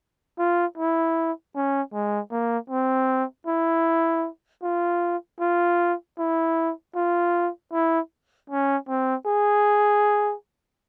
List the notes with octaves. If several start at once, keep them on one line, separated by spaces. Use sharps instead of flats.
F4
E4
C#4
G#3
A#3
C4
E4
F4
F4
E4
F4
E4
C#4
C4
G#4